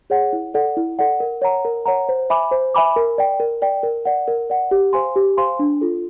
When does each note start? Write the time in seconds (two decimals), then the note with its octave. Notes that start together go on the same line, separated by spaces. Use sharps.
0.10 G#4 C#5 F#5
0.33 E4
0.54 A4 D5 F#5
0.77 E4
0.99 A4 D5 F#5
1.20 A#4
1.42 C#5 F#5 A#5
1.65 A#4
1.85 C#5 F#5 A#5
2.09 C5
2.30 E5 G#5 B5 D6
2.51 C5
2.75 E5 G#5 B5 D6
2.96 A#4
3.18 D5 G5
3.40 A#4
3.62 D5 G5
3.83 A#4
4.05 D5 F#5
4.28 A#4
4.50 D5 F#5
4.71 G4
4.93 C5 F5 G#5 C6
5.16 G4
5.37 C5 F5 G#5 C6
5.59 D4
5.81 F4 A4